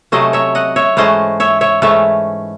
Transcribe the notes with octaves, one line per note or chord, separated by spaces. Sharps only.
C3 F#3 A3 C#4 C5 D#5
C#5 E5
D#5 F#5
C#5 E5
G#2 E3 A3 C#4 C5 D#5
C#5 E5
C#5 E5
G#2 E3 A3 C#4 C#5 E5